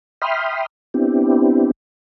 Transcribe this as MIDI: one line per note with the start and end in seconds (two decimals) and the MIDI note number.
0.22 0.66 76
0.22 0.66 79
0.22 0.66 83
0.22 0.66 84
0.22 0.66 87
0.22 0.66 89
0.94 1.71 59
0.94 1.71 60
0.94 1.71 62
0.94 1.71 64
0.94 1.71 67